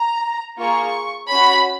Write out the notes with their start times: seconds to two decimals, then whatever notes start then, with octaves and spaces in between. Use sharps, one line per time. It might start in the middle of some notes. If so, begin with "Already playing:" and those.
Already playing: A#5
0.57 A#3 F4 G#4 C#6
1.28 C#4 F#4 B5